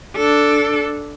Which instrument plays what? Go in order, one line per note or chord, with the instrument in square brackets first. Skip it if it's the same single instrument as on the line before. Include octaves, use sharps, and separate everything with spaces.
[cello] D4 A4